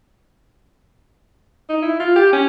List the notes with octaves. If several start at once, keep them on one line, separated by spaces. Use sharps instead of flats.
D#4
E4
F4
G4
C#4